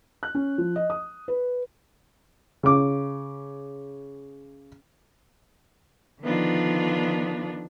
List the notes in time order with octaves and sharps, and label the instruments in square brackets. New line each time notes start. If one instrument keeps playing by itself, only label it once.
[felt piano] F#6
C#4
F3
D#5
D#6
B4
[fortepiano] C#3 D6
[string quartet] D3 D#3 F3 B3 D4 F4